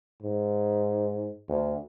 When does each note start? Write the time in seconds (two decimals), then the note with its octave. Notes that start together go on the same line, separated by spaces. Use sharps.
0.22 G#2
1.49 D2